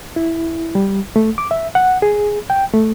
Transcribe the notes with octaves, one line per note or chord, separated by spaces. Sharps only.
E4
G3
A3
D6
E5
F#5
G#4
G5
A3